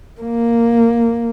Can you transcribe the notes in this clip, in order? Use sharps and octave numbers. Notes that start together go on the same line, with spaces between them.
A#3